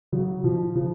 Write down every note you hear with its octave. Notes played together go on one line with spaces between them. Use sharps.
C#3 F#3
B2 F3
C#3 F3